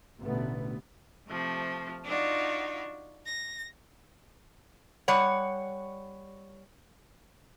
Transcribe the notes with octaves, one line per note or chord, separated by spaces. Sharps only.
A1 B2 D3 A3 B3
C3 F3 A3
D4 D#4 F4 F#4
A#6
G3 C#5 F#5